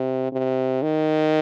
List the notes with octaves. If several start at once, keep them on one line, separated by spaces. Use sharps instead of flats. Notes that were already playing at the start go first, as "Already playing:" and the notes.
Already playing: C3
C3
D#3